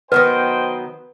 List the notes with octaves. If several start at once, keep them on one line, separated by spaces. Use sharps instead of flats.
D#3 F#3 B3 B4 C5 D#5 G5